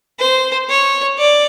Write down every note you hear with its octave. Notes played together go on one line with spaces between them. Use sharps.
C5
C#5
D5